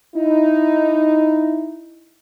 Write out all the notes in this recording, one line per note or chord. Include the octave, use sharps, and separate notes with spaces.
D#4 E4